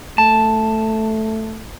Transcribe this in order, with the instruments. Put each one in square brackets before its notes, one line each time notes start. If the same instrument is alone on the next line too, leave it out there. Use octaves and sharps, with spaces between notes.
[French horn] A3 [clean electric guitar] A5